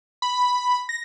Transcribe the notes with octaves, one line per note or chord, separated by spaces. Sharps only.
B5
A#6